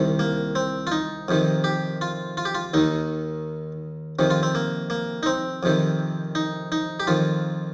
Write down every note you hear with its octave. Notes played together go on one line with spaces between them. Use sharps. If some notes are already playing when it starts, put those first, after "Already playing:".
Already playing: C2 C3 D#3
A#3
C4
F4
D#4
F2 C3 D#3
G4
F4
F4
G4
F4
D#2 D#3 D#4
F2 C3 D#3
F4
C4
A#3
A#3
D#4
C4
F2 C3 D#3
D#4
D#4
G4
F2 D#3 F4